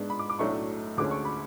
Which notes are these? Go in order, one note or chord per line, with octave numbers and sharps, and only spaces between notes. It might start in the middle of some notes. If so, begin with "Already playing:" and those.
Already playing: G#2 G#3 B3 D4
B5
D6
D6
B1 A2 F#3 A3 D4 C#6
D2 D3 G#3 C#4 D6
C#6
B5